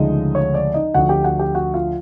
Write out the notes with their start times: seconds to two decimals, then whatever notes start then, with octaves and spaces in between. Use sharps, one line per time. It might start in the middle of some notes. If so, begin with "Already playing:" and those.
Already playing: D2 C#3 F3 G#3 D#4 D#5
0.35 C#5
0.54 D5
0.74 D#4 D#5
0.94 D2 D3 F3 F#4 F#5
1.09 G4 G5
1.24 F#4 F#5
1.39 G4 G5
1.55 F#4 F#5
1.74 F4 F5